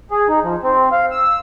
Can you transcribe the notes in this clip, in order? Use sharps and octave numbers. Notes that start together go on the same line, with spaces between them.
G#4
D#4
F3
C4
F5
E6